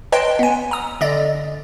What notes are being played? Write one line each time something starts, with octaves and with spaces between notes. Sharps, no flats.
B4 C#5 D#5 G5 A5 C6
B3 G#5
A#5 D#6
D3 D5 D#5